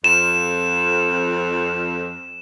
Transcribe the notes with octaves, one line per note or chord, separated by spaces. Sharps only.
F2 E7